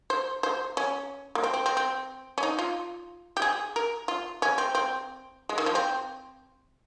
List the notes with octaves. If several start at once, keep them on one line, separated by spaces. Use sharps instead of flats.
C5
C5
C#4
A#3
C4
C4
C4
C4
C#4
D#4
F4
G4
G#4
A#4
F4
C#4
C4
C4
G#3
D#3
F3
C4